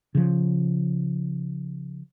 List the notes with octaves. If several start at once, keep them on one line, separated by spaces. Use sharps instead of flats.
C#3 F3